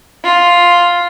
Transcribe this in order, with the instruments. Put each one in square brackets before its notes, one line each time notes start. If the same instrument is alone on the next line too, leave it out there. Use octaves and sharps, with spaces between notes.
[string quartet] F4